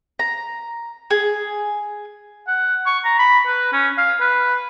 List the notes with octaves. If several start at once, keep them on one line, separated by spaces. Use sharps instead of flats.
A#5
G#4
F#5
C#6
A#5
B5
B4
C#4
F5
B4